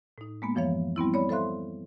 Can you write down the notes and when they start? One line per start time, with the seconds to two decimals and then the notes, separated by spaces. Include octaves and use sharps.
0.18 A2 D#4
0.42 G#3 A#3 B3
0.55 F#2 E3 F3 C#5 F5
0.96 G3 B3 C4 E4
1.14 C#5 D5 B5
1.29 A4 C5 E5 F5 C6 F#6